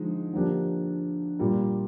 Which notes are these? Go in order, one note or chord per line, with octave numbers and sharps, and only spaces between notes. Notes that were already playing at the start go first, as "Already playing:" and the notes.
Already playing: D3 F3 G#3 D#4
D3 F3 A#3 D4 G4
A#2 G3 A#3